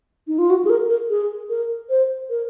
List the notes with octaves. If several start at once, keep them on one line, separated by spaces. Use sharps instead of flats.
D#4
F4
F#4
G#4
A#4
A#4
G#4
A#4
C5
A#4